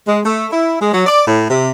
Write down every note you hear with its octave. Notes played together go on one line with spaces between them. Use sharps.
G#3
A3
E4
G#3
F#3
D5
A2
C3